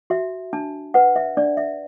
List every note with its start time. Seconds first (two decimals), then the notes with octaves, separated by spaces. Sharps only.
0.10 F#4 E5
0.53 D4 A5
0.94 B4 F#5
1.16 E5
1.37 D4 D5
1.57 E5